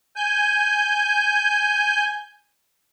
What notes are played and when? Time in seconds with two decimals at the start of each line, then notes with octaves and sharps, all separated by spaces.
0.16 G#5 G6